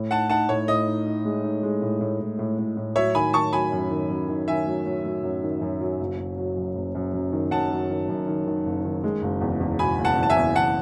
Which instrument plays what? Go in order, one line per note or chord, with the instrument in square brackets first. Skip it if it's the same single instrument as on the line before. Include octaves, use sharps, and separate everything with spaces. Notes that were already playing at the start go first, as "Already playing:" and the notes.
Already playing: [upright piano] A2
[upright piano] D#4 [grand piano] F#5 A5
[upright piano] D#4 [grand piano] F#5 A5
[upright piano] A2 [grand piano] C#5
[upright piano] A2 [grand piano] D#5
[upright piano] D#4
D#4
G#3
D#4
G#3
A2
A2
A2
A2
A2
A2
[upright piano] F#3 [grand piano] C#5 E5
[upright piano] D#3 [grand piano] G#5 B5
[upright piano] D#3 [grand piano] A5 C#6
[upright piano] F#3 [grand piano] G#5 B5
[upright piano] F#2
D#3
F#2
D#3
[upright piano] D#3 [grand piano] E5 G#5
[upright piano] F#3
F#3
F#3
F#2
D#3
F#2
F#3
F#1
F#3
F#3
F#2
F#1
F#2
F#2
D#3
[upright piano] F#2 [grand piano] F#5 A5
[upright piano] F#3
D#3
F#2
D#3
D#3
F#1
D#3
G#3
F#1
E2
E2
[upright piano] B2 [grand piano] G#5 B5
[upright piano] F#1
[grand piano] F#5 A5
[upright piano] E2
[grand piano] A5
E5 G#5
[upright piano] E2
[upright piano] E2 [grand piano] F#5 A5